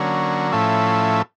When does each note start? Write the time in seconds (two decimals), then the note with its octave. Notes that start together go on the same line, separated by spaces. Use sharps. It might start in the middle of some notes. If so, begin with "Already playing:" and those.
Already playing: D3 F#3 A#3 C#4
0.52 A2 F3 A3 C#4 E4